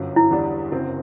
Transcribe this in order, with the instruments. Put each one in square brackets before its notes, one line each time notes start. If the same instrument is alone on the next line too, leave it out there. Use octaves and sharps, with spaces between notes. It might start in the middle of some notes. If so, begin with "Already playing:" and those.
Already playing: [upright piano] G1 F#2 F#3
[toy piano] E4
[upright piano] E2 D3 G3 D4
F#1 F#2 F#3 C4